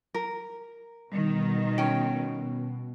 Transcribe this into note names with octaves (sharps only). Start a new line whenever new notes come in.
A#4
B2 D#3 G3
C#4 G5